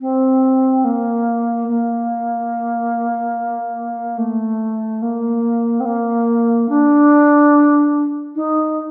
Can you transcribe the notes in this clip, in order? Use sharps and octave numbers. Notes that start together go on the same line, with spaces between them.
C4
A#3
A#3
A3
A#3
C4
A#3
D4
D#4